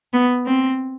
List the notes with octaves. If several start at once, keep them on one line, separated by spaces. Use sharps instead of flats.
B3
C4